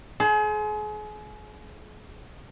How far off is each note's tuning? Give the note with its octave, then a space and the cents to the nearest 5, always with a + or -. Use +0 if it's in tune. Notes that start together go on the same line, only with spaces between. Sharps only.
G#4 +35 C5 +0